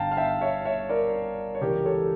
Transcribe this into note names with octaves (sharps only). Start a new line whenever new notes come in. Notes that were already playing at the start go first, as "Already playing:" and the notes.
Already playing: G1 G2 D3 F5 G5 A5 A#5
F5
E5 G5
C#5 E5
C#5 E5
A#4 D5
C#5
C#2 C#3 E3 G4 A#4
A4 C#5